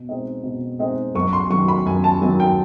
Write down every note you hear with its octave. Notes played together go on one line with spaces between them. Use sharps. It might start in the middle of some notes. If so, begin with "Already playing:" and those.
Already playing: B2
G#3 C4 D#4
B2
G#3 C4 D#4
F#2 C#6
C6
D#3 F#3 C#6
B5
F#2 G#5
A5
D#3 F#3 G#5
G5